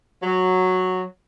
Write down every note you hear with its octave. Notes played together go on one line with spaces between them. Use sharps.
F#3